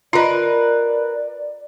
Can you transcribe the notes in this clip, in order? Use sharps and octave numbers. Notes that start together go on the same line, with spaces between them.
F4 A#4 B4 D5 D#5